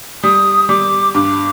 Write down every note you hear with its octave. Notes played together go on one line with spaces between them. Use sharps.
G3 D#6
G3 D6
G2 D6